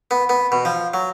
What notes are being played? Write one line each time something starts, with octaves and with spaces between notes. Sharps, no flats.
B3
B3
B2
F3
F#3